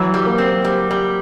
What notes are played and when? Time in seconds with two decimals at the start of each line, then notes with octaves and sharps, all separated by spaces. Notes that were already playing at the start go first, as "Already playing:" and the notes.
Already playing: E3 F#3
0.14 G3
0.26 A#3
0.38 C4
0.65 G3
0.91 G3